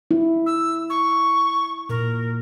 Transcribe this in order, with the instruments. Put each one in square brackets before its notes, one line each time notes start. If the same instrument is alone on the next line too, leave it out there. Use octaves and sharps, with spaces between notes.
[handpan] E4
[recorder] E6
C#6
[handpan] A#2 [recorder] A#4